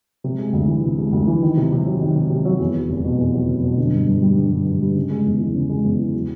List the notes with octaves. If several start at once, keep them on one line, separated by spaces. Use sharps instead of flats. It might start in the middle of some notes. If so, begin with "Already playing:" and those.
C3
G#3
D2
E3
C3
G#3
D2
E3
D#3
C3
C3
F#3
D#3
C3
C3
F#3
E2
F#3
F1
B2
E2
F#3
F1
B2
D3
G2
G2
G3
D3
G2
G2
G3
C#3
G#3
E2
E3
C#3
G#3
E2
E3
F#3